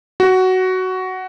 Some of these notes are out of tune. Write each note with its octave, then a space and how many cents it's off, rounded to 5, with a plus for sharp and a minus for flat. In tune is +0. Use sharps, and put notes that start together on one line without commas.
F#4 +10